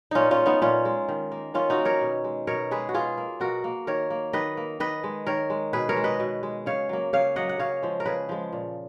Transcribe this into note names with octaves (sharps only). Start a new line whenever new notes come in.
A#2 C#4 D#4 F4
C#4 F4
G#3
B3 D#4
A#2 C#4 F4
G#3
D#3
A#3
D#3 C#4 F4
D#4 F#4
A#3
A#4 C#5
B2
G#3
B2 A#4 C#5
G#3 G#4 B4
F#4
B2 F4 G#4
A#3
B2 F#4 A#4
A#3
D#3 A#4 C#5
A#3
D#3 B4 D#5
A#3
D#3 B4 D#5
G#3
D#3 A#4 C#5
G#3
B2 G#4 B4
A#4 C#5
G#3
B4 D#5
B2
G#3
C#3 C#5 F5
F#3 A#3
C#3 C#5 F5
F#3 A#3 D#5 F#5
F#5
C#3 C#5 F5
F3 G#3
A#4
C#3 G#4 B4
F3 G#3
A#2